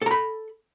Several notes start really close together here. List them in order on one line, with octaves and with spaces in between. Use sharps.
A4 A#5 B5